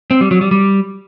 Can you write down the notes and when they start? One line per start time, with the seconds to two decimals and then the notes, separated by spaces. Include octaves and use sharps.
0.11 C4
0.21 G3
0.31 F#3
0.41 G3
0.51 G3